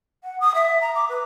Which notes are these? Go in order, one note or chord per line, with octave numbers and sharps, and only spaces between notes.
F#5
D#6
E5
A#5
D6
B4